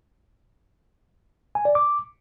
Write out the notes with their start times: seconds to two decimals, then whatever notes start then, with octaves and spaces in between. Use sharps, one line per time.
1.55 G#5
1.65 D5
1.75 D6